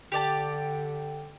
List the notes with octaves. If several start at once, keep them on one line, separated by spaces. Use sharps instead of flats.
D3 G4 D5 A5